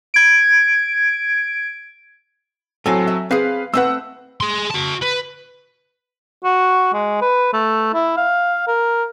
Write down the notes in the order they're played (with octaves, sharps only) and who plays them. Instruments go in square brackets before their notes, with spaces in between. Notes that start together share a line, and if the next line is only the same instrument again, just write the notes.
[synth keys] G#6 D7
[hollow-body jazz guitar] A2 F5 G#5 [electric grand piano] F#3 C4 A4
[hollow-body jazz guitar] E5
[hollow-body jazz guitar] C4 G#4 [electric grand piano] B4 F5 C7
[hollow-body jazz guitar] A3 C4 B4 [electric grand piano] F#5 E6
[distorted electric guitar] G#4 C6
F#4 A5
B4
[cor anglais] F#4
G#3
B4
A3
E4
F5
A#4